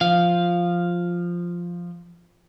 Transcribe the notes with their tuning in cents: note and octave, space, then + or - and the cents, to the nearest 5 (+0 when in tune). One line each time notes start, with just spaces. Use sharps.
F3 +0 F5 +0